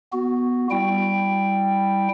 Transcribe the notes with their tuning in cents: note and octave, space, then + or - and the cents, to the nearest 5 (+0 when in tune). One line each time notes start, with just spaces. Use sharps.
B3 +0 F#4 +0
G3 +0 E4 +0 G5 +0